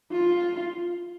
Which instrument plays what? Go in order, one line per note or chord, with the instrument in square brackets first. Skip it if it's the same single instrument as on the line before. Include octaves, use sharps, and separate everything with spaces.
[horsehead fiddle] F4